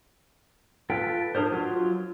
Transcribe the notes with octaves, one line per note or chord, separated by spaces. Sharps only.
F4 A4 B4 G5
D4 G#4 A#4 C5
F#3 F4